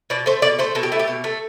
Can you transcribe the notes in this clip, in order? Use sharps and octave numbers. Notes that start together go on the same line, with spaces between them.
B2 D5
A3 C5
B2 D5
A3 C5
B2 A4
G4
A3 E4
G4
B2
A3